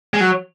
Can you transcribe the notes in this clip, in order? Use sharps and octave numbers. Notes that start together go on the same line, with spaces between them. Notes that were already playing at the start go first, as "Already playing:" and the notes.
G#3
F#3